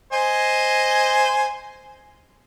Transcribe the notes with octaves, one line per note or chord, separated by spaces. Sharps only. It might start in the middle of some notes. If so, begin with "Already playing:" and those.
C5 D#5 G#5